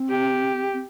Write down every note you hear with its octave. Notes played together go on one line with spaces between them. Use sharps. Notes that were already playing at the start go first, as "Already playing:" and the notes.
Already playing: C4
G4
C4